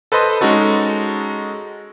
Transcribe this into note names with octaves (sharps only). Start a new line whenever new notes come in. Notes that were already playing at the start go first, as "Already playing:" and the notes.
A4 B4 C5 D#5 C6
G#3 C#4 D#4 F#4 A4